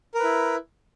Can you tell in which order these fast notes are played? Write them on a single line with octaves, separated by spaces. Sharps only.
A#4 B4 E4